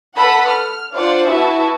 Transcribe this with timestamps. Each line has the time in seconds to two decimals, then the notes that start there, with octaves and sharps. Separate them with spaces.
0.17 A4 B4 F#5 B5
0.48 F6
0.93 D4 F4 C5 D5 F#5
1.30 B3 E4 F#4 E5 A5